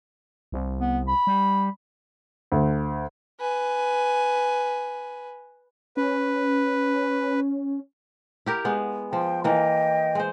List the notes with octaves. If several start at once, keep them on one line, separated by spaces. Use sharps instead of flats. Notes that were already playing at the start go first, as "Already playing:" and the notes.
C2
B3
B5
G3
D2
B4 G#5
C#4 B4
E4 G4 A#4
G#3 B3
F3 G5 C6
E3 A#3 D#5 G5
G#3 C5